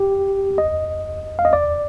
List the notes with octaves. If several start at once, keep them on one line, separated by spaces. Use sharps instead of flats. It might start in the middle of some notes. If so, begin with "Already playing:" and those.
Already playing: G4
D#5
F5
D#5
D5